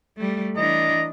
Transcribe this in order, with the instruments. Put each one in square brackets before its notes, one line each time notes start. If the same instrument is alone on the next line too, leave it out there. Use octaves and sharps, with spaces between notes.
[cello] G3 A3
[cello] E3 D4 [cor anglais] D#5 [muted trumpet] A#5